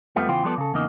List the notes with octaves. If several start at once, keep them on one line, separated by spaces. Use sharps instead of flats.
F2 F3 G3 A3 B3
E2 C#3 E3 F4 C5 G5
F3 G3 B3 A4 D5
C#3 A4
E2 C#3 A#3 D#4 D#5